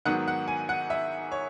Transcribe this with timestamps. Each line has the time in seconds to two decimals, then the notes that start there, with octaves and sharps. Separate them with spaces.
0.05 G#2 D#3 F#3 B3 F#5
0.28 F#5
0.48 G#5
0.69 F#5
0.90 E5
1.32 C#5